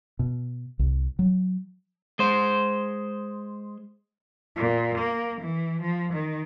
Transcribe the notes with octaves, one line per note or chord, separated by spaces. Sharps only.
B2
C2
F#3
G#3 C5
A#2
A#3
E3
F3
D#3